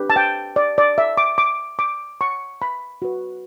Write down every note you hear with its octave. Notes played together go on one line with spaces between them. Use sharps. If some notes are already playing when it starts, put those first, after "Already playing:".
Already playing: D4 G4 B4
A5
G5
D5
D5
E5
D6
D6
D6
C#6
B5
F#4 B4